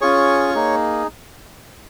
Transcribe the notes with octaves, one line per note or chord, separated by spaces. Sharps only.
C#4 F4 G#4 C#5 C#6
A#3 D#4 G#4